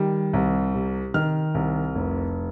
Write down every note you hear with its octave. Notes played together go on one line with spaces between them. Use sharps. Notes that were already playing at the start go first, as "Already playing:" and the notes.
Already playing: D#3 G3
C2
C3
D#3 F6
C2
F1